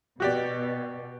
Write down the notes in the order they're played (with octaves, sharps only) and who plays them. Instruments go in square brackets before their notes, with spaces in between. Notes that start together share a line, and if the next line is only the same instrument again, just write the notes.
[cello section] B2 [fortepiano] F#4 G4 D5